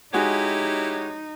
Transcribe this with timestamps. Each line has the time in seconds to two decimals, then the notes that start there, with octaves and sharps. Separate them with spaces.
0.13 G#3 D#4 E4 F#4 G4 C#5 G#5